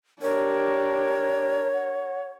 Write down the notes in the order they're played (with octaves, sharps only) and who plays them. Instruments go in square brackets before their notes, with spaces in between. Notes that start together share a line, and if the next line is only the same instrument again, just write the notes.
[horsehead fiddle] D4 G4 [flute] A#4 [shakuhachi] C#5
[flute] F#5